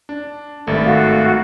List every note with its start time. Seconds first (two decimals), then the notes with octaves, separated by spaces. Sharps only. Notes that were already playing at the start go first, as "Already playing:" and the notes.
0.09 D4
0.67 G#1 G2 A3
0.85 F#4 F5